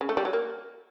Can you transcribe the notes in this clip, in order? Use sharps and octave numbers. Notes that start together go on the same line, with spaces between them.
C#3
A3
G3
F#3
A#3